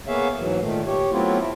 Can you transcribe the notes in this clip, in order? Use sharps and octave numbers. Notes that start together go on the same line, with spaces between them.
A#3 B3 G#4 C#5 E5 F5
G#2 E3 F#3
A#2 D#3 A3
G4 C#5
F#3 A3 B3 C4 E4 F4
E4